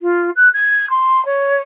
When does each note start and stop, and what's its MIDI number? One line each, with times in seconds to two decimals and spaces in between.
0.01 0.31 65
0.36 0.49 90
0.54 0.89 92
0.90 1.25 84
1.25 1.62 73